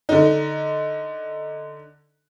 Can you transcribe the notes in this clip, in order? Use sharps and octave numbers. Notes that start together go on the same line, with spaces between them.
D3 D#4